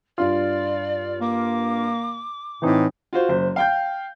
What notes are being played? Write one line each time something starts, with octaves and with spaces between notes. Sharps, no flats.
G2 F4 D5
A#3 D6
A2 E3 C4 D#4
F4 F#4 C5
F#1 C5
F5 G5 G6